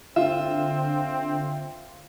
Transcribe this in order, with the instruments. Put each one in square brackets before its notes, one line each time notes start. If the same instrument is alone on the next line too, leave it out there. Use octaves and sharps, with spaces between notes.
[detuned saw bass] D3 [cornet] C4 [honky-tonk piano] F4 [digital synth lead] E5